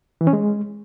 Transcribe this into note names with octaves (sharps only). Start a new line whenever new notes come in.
E3
C#4
G#3